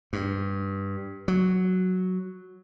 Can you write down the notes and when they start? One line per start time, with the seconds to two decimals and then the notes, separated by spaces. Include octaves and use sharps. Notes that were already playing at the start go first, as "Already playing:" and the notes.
0.13 G2
1.28 F#3